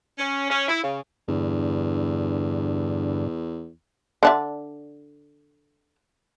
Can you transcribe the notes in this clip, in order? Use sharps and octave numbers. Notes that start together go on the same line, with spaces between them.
C#4
C#4
E4
C#3
E2 G2 D3
D3 D4 E5